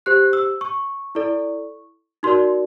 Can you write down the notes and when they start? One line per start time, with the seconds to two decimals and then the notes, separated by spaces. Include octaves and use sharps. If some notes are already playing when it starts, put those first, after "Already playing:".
0.06 G4 C5 F#6
0.33 E6
0.61 C#6
1.15 E4 A4 D5
2.23 D#4 F#4 A#4 D5 C6